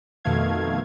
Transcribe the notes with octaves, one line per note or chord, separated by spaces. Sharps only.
F2 B2 D#3 A3 F5 G#6